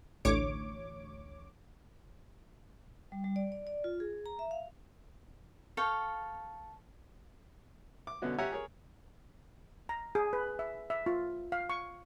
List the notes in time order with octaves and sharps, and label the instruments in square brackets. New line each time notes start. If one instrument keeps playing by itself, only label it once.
[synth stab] A1 D2 C#5 D6
[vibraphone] G3
G3
D5
D5
D5
F4
G#4
A#5
E5
F5
[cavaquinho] A4 C#5 F5 G5
[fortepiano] D6
B2 D3 B3 C#4 F#4
G4 C#5 E5 F#5 G#5 A#5
G#4 A#4 C#5
[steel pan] A#5
G#4
B4
E5
E5
F4
F5
C#6